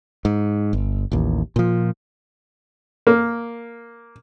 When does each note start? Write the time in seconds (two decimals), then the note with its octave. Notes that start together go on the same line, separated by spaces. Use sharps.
0.25 G#2
0.73 G1
1.12 A1 D#2
1.56 A#2 F3
3.07 A#3